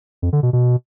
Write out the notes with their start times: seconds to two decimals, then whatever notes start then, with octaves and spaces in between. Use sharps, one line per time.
0.22 F2
0.33 D3
0.43 B2
0.53 B2